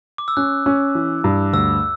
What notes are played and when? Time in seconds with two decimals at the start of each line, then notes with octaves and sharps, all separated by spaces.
0.18 D6
0.28 E6
0.37 C#4 F#6
0.66 C#4
0.95 E3
1.24 G2
1.53 D2 E6